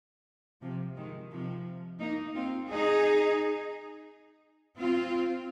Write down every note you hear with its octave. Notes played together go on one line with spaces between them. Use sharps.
C3 F3
D#3 G#3
C3 F3
A#3 D#4
C4 F4
D#4 G#4
C4 F4